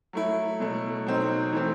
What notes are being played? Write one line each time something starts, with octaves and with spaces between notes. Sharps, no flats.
F#3 A3 E4
B2 F#3 A3
B2 F#3 C4 D#4
E3 A3 C4